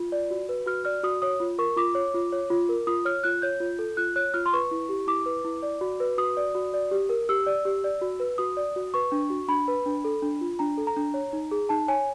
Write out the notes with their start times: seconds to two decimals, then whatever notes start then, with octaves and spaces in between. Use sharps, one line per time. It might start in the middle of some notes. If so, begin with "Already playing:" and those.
Already playing: F4
0.12 D5
0.31 F#4
0.49 B4
0.66 F#4 F6
0.85 D5 F6
1.03 F#4 D#6
1.22 C#5 D#6
1.40 F4
1.58 A#4 C#6
1.77 F4 D6
1.95 C#5
2.14 F4
2.32 C#5
2.50 F4
2.69 A#4
2.87 F4 D#6
3.05 C#5 F6
3.24 F4 F#6
3.42 C#5 G6
3.60 F4
3.79 A4
3.97 F4 F#6
4.16 C#5 F#6
4.34 F4 F6
4.46 C6
4.53 B4 C#6
4.71 E4
4.89 G4
5.07 E4 D6
5.26 B4
5.45 E4
5.63 D5
5.81 F#4
6.00 B4
6.18 F#4 D#6
6.37 D5
6.55 F#4
6.74 D5
6.91 G4
7.09 A#4
7.29 G4 E6
7.47 D5
7.65 G4
7.84 D5
8.01 F#4
8.20 B4
8.38 F#4 D#6
8.57 D5
8.76 F#4
8.94 B4 C#6
9.12 D4
9.30 F#4
9.48 D4 B5
9.68 B4
9.86 D4
10.05 A4
10.22 D4
10.41 F4
10.59 D4 A#5
10.78 A4
10.87 A#5
10.97 D4
11.14 C#5
11.33 D#4
11.51 G#4
11.69 D#4 A5
11.88 C#5 G#5